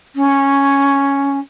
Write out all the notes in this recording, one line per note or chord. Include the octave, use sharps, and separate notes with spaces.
C#4